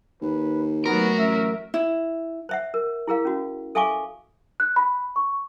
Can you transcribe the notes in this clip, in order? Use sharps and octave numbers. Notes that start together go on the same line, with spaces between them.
D#2 B4
F#3 A3 B3 F#4 A#4
A1 E5
E4
C5 E5 F#5
A#4
E4 G#4 A#4 F5
C#4 F#4
A4 E5 F5 G#5 C#6 D6
F#6
B5
C#6